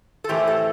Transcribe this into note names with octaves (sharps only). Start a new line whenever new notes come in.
A4
A2 E3 A3 C4 G4
A4